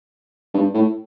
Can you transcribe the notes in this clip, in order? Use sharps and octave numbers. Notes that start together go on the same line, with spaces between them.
G2
A2